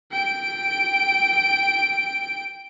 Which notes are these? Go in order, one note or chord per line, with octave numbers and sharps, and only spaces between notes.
G5 D7